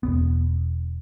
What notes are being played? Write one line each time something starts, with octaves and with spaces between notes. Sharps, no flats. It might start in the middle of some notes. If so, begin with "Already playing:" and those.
E1 D#2 B3